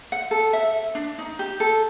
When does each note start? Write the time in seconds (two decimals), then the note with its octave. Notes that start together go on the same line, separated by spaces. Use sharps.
0.12 F#5
0.31 A4
0.53 E5
0.95 D4
1.18 D#4
1.39 G4
1.60 A4